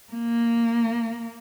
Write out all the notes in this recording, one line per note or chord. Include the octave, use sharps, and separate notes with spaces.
A#3